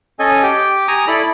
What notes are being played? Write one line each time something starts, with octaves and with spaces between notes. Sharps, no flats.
C#4 A4 D#5 G#5
G4 G5
G#5 A#5 C#6 D#6
E4 A4 D5 B5